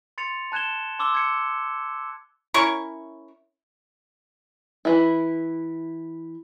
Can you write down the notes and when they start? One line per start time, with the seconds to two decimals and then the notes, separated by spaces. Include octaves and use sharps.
0.18 C6 A6 C#7 F7
0.52 A5 F#6 G#6 E7 G7
0.99 A5 C6 D6 E6 G7
1.14 G#6 C#7
2.54 C#4 E4 A#4 C#6
4.85 E3 E4